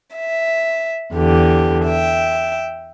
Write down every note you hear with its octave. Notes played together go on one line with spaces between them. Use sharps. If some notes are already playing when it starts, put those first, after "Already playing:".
E5
E2 D3 G4
E5 G5